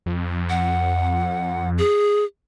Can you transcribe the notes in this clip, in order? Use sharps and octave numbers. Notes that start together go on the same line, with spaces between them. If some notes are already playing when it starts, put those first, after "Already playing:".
F2
F#5
G#4